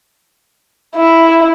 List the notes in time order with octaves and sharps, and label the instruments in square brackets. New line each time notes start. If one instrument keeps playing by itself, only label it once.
[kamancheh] E4